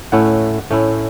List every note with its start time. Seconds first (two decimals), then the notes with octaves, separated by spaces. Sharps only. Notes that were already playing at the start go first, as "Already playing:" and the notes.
0.12 A2 A3 C#4 E4 F#5
0.71 A2 A3 C#4 E4